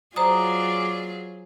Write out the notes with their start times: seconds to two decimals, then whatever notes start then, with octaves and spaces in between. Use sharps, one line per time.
0.16 F#3 F4 G#4 C5 D5 A#5 D#6